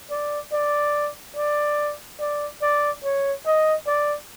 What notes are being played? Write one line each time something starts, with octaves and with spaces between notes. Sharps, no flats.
D5
D5
D5
D5
D5
C#5
D#5
D5